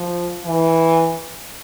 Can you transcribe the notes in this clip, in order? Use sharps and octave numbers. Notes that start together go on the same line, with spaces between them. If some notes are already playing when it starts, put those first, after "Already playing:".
Already playing: F3
E3